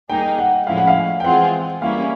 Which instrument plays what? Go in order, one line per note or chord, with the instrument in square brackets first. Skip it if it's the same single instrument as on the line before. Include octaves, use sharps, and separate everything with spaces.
[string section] G3 A#3 D#4 G#4 [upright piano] G5
[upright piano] F#5
[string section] A2 F3 G#3 C#4 E4 [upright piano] F5
[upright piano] F#5
F5
G5
[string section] E3 G#3 C4 F4 G#4 [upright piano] F#5
[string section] G3 A#3 C#4 E4 [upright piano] F5